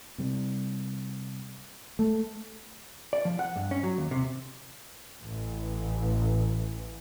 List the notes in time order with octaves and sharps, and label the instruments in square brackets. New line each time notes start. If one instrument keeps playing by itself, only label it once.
[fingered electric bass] C3 G3
A3
[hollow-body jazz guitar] D5
F3
F#5
G2
C#4
F#3
D#2
C3
[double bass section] A1 E3